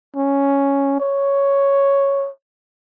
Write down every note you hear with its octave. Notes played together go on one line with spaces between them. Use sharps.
C#4
C#5